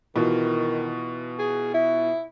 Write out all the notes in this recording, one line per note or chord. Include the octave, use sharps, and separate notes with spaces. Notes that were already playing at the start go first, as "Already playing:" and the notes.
B2 D#3 E3 F4
G#4
E4